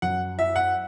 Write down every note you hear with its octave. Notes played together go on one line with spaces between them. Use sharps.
F#2 F#5
E4 E5
F#5